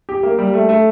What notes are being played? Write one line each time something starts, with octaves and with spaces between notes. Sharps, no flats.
G4
A#3
G3
A3
A3